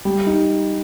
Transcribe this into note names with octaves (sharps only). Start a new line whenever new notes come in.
G3
D#4